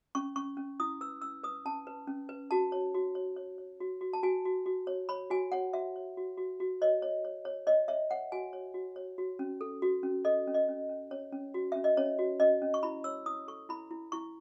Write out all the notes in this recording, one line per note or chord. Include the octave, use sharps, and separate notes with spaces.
C#4 C#6
C#4 C#6
C#4
E4 D#6
B4 E6
C#4 E6
B4 D#6
C#4 A5
B4
C#4
B4
F#4 A5
C#5
F#4
C#5
C#5
C#5
F#4
F#4
A5
F#4 G#5
F#4
F#4
C#5
C#5 B5
F#4 G#5
C#5 F#5
F#4 E5
C#5
F#4
F#4
F#4
C#5 D#5
C#5
C#5
C#5
C#5 D#5
C#5 E5
C#5 F#5
F#4 G#5
C#5
F#4
C#5
F#4
C#4
A4
F#4
C#4
A4 D#5
C#4
D#5
C#4
C#4
C#4 C#5
C#4
F#4
C#4 E5
D#5
C#4 C#5
F#4
C#4 D#5
C#4
C#6
E4 B5
C#5 E6
E4 D#6
A4 C#6
E4 B5
E4
E4 C#6